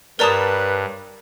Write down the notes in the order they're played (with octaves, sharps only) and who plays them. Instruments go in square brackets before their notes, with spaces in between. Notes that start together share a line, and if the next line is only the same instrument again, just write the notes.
[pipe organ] G2 [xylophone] A#4 D5 A#5 [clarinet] B4 [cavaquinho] C#5 A5 D#6